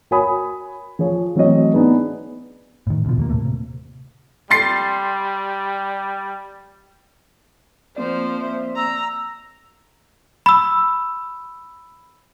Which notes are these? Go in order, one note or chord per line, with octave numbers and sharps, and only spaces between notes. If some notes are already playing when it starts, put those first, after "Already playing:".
F#4 A#4 C#5 G#5 B5 D#6
F3 G#4 C#5
E3 F#3 A3 C4 C#5 D#5
B3 D4 D#4 G#4 B4
A2 D#3
D2 B2 F3
D#2 F#3 A#3
A2 C3 A3 A#3
C3
G3 C6 A6 C7
F3 A#3 C4 C5 D5
E5
A#5 E6
B5 E6